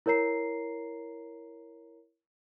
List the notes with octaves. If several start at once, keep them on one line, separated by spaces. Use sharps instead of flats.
E4 A#4 C#5 A#5 C7